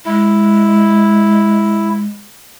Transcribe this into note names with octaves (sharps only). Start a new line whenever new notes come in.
G#3 E4